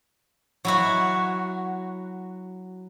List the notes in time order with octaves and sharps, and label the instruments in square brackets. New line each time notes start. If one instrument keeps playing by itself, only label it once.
[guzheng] F#3 E4 F#4